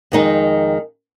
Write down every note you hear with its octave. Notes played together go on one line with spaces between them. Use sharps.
F2 D#3 G#3 D#4